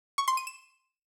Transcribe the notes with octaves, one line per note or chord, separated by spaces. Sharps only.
C#6
C6
D#7
E7